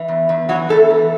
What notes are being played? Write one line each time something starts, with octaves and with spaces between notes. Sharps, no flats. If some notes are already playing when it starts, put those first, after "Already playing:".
Already playing: E3
E2
E2
E3 F#3 F#4
E2 A3 A4
E3